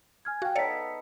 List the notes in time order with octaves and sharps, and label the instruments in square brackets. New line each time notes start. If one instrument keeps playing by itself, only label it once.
[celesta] G#5 F6 G#6
[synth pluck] F#4 [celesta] F5 G5
[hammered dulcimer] B3 D#4 A4 [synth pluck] C#5 D5 F5 [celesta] B6 C#7